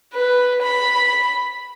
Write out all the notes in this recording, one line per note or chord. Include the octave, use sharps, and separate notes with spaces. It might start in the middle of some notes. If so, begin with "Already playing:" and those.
B4
B5